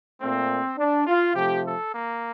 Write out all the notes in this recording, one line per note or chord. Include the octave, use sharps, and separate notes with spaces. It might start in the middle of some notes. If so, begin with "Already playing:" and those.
A#2 A3 C4
D4
F4
C3 F3 A3 G4
A4
A#3